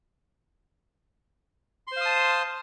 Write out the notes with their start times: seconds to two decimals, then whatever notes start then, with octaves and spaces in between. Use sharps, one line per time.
1.87 C6
1.92 C5
1.96 F5
2.01 D#6
2.06 A5